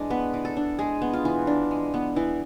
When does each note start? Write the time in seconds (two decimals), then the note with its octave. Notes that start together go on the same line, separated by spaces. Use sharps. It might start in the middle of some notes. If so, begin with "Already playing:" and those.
Already playing: E3 G#3 D4 D5
0.10 B3 B4
0.33 E3
0.45 A4
0.57 D4
0.79 G#3 G#4
1.02 B3
1.13 F4
1.25 E3
1.47 D4
1.71 G#3
1.94 B3
2.16 E3 E4